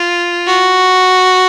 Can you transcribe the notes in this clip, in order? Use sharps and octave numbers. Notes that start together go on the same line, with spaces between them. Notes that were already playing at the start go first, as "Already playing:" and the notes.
Already playing: F4
F#4